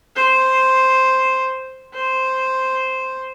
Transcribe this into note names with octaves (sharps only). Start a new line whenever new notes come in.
C5
C5